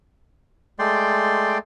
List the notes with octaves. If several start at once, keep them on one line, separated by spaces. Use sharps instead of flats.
G#3 A3 D5 G5 C6